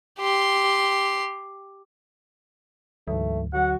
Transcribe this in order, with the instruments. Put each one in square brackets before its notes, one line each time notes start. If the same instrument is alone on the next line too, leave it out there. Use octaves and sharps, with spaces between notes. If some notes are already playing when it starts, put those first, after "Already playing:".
[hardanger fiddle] G4 C6
[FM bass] D2 [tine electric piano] G#2 E3 F#3 [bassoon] A3
[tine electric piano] D3 F#3 [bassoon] F#4 [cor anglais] F#5